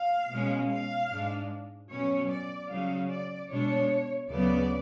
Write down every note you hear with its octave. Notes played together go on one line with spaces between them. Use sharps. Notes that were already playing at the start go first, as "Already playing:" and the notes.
Already playing: F5
B2 G#3 C#4
F5
G#2 G#3 D4
B2 F#3 C#4 C#5
D5
C#3 F#3 C#4 F5
D5
B2 G#3 D4 C#5
D2 C#3 F#3 B3 D5